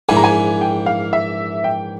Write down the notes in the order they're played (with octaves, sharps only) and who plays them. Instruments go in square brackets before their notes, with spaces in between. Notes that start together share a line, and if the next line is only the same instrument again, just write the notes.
[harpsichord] A#1 G#2 E3 [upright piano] G#5
[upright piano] A#5
G#5
G5
F5
E5
G5